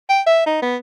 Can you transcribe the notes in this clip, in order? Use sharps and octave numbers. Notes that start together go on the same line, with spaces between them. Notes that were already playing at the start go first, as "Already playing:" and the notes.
G5
E5
D#4
B3